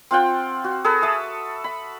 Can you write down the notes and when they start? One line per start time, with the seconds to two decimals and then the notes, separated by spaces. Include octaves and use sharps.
0.11 C4 F4 F#5 G5
0.64 F#4
0.84 G#4 A4 B4
1.02 E5 A5 D#6
1.64 B5